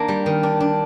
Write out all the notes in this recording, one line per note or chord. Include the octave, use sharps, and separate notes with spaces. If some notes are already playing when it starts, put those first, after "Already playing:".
Already playing: D#3 A#3 D4
G3
D#3
D4
D4